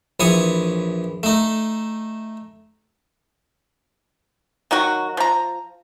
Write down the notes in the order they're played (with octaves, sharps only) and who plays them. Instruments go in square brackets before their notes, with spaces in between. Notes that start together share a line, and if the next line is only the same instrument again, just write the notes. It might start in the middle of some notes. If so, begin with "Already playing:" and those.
[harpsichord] A#1 E3 C#5 C#6 D#6
A3 D#4
[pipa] D#3 F#3 F#4
F3 A#5